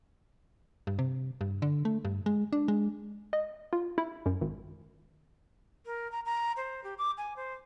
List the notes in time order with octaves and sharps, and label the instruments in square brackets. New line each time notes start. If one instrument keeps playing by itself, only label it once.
[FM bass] G2
C3
G2
D3
A3
G2
G#3
D4
G#3
[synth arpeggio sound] D#5
F4
E4
F#2
G#1
[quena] A#4
A#5
A#5
C5
G4
D6
G#5
C5